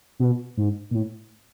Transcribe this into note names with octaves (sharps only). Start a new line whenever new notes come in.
B2
G#2
A#2
A2